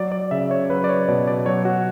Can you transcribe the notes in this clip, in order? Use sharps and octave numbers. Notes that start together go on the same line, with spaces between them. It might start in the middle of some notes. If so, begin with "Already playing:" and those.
Already playing: F#3 D5
D5
C#3 E5
C#5
F#3 B4
D5
C#5
B2 D5
D5
F#3 C#5
F#4